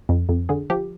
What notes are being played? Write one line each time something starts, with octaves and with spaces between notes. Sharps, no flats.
F2
F2
D3 G#4
F3 G4